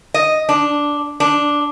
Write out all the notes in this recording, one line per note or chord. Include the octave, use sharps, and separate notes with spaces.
D#5
D4
D4